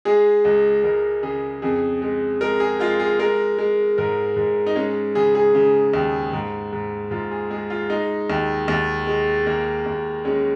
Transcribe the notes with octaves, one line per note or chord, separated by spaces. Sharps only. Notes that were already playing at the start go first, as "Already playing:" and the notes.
G#3 G#4
C#2
C#2 A#4
C#3 G#4
F2 G#4
G#3
G#3 A#4
G#4
G#3 F4
G#4
G#3 A#4
G#3
G#2 A#4
G#2
D#4
G#3 C#4
C#3 G#4
G#4
C#3
D#2
G#2
G#2
G#2 F4
G#4
G#3 G#4
F4
G#3 D#4
D#2
D#2
G#3
D#2 A#3
D#2
G#3 C#4